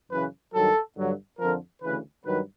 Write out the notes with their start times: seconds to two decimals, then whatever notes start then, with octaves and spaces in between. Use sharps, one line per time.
0.10 F#2 C#3 E3 B4
0.53 G2 D#3 F#3 A4
0.97 G2 D3 F#3
1.39 F2 D3 F3 A#4
1.82 D2 C#3 E3 B4
2.25 G2 D#3 F#3 B4